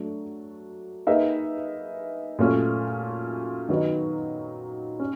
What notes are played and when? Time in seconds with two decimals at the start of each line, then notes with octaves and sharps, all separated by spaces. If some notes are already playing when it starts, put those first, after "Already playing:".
Already playing: F#3 A3 D4
1.07 A#3 D#4 G#4 B4 E5
2.39 A#2 F#3 A3 C#4 F4
3.69 D#3 F#3 B3 D#4
5.00 C#4